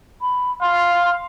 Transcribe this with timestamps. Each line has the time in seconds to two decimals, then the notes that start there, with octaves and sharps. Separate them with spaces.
0.22 B5
0.62 F5 C6